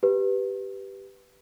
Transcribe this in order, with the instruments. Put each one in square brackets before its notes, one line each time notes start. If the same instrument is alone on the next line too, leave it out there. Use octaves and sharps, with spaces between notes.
[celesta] G4 B4